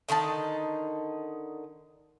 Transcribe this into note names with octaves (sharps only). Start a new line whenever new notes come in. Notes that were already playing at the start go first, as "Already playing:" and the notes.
D3 D#3 D#4 A5